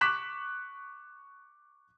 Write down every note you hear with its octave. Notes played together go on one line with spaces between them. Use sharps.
C#6 D6 F#6 B6 E7 F#7